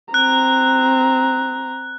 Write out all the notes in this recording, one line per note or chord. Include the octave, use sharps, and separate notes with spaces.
C4 A#5 F#6